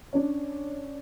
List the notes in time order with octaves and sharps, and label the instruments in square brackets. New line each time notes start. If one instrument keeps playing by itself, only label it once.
[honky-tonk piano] C#4 D4